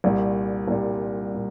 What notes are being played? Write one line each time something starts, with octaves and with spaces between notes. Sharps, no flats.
C2 A#2 G3
C2 A#2 G3
A#2